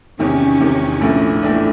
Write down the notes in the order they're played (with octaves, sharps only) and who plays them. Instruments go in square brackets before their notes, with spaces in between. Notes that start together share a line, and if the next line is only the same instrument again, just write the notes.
[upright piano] E2 C3 D#3 [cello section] C#4
[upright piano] E2 C3 D#3
A#1 A2 E3 A3 D4
A#1 A2 E3 A3 D4